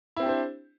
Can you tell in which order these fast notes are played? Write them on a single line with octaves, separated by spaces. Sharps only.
E4 C4 G4 D4 C5